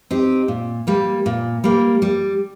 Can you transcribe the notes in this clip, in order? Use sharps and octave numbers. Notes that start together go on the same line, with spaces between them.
C4 D#4 G4
A#2
G3 A#3
A#2
G3 A#3
G3